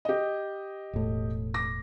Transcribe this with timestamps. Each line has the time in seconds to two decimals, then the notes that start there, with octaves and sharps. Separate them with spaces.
0.05 G4 D#5
0.93 E1 A2
1.54 D6 A#6